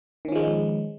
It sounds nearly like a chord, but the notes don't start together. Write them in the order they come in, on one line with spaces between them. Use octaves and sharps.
D#3 C#4 F3 G#3